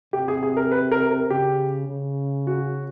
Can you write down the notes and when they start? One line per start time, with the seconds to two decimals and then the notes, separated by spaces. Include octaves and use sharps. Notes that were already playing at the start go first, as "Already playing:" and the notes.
0.13 C3 G4
0.28 G#4
0.43 G#4
0.57 A#4
0.72 B4
0.92 A#4
1.11 A#4
1.30 C#3 G4
1.88 C#3
2.47 F#4